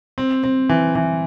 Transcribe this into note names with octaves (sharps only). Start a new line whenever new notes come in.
C4
C4
E3
E3